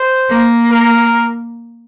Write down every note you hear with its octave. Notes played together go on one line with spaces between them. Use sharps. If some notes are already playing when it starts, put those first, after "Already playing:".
Already playing: C5
A#3
A#4